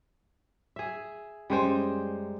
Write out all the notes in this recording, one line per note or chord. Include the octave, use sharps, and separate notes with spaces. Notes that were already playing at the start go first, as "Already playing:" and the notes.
G#4 E5
F#2 G3 G#3 C5